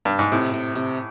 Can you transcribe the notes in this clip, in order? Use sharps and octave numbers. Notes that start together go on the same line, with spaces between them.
G2
G#2
A2 C3
C3
C3